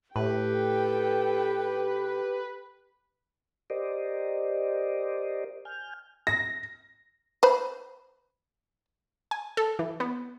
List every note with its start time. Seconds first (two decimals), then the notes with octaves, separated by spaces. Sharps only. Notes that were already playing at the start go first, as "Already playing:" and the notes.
0.16 A2 G4 A4 B4 G5
3.70 G4 A#4 C5 D5 D#5
5.65 G#5 F6 G6
6.27 A#6
7.43 B4 C5 B5
9.31 G#5
9.57 A4
9.79 E3
10.00 B3